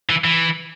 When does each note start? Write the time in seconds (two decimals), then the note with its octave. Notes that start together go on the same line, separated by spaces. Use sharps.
0.10 E3
0.24 E3